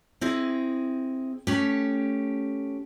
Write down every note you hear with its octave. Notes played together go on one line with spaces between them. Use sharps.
C4 E4 G#4 D#5
A3 C#4 G4